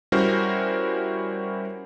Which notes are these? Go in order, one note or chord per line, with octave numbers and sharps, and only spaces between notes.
G3 C#4 E4 F#4 A#4 C5